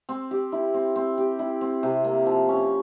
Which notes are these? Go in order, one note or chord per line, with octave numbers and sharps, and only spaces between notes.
C4
G4
E4
C4
C4
G4
E4
C4
C3
A#3
F3
C#4